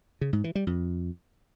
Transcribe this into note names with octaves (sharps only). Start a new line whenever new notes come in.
C#3
G#2
E3
G3
F2